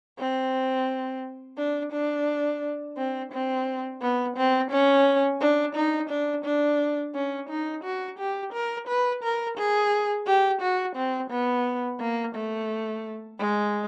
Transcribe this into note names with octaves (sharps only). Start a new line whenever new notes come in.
C4
D4
D4
C4
C4
B3
C4
C#4
D4
D#4
D4
D4
C#4
D#4
F#4
G4
A#4
B4
A#4
G#4
G4
F#4
C4
B3
A#3
A3
G#3